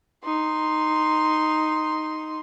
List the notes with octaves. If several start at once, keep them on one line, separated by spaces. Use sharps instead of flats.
D#4 C6